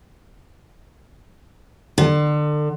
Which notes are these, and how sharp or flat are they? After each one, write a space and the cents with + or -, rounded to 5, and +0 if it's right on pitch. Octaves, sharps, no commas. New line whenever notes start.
D3 +30